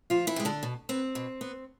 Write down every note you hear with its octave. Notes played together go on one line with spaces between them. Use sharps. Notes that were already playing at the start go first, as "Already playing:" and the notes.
D2 F3 F4
E3 E4
C3 G#3
D3 D4
B2
B3 C4
B2
B3